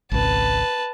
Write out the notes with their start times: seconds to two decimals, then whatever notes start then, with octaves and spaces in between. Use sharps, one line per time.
0.12 G#1 C#2 B4 A5